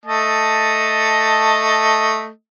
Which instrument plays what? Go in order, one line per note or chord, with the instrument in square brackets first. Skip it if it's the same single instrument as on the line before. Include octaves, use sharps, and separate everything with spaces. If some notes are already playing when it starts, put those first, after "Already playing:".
[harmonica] A3 D#5 A5